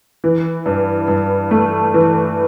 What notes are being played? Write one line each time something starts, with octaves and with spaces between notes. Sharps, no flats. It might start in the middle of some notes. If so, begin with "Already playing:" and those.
E3
G2
G2
A3
E3